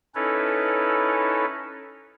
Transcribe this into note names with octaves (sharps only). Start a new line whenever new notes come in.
C#4 D#4 E4 A4 B4 C#5